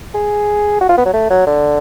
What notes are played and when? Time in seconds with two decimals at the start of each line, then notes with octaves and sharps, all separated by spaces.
0.14 G#4
0.81 F#4
0.89 F4
0.97 B3
1.05 F#3
1.14 A3
1.30 F#3
1.47 D3